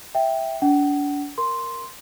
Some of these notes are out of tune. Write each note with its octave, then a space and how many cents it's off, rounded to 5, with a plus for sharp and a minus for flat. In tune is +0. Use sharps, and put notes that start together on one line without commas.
E5 +0 G5 +0
D4 -35 F#5 +35
A#4 +0 C6 +0